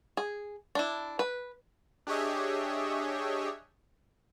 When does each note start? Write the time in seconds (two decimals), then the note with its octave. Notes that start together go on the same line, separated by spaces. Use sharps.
0.17 G#4
0.75 D4 E4
1.19 B4
2.07 D4 G4 G#4 C#5 D#5 E5